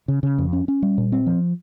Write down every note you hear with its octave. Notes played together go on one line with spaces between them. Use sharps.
C#3
C#3
F2
C#4
C#4
G3
A#2
C4
F3